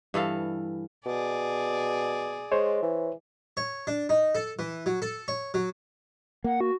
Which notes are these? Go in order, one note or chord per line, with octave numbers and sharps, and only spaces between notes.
G2 E3 A4 F5
B2 G#4 D5
G#3 C5 C#5
E3
C#5
D4
D#4
A4
E3
F#3
A4
C#5
F#3
A#3 F#5
F#4